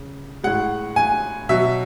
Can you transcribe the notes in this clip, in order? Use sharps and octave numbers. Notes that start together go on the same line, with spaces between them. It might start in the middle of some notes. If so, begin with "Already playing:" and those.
Already playing: C#3
A2 G#3 F#5
G#5
B2 F#3 E5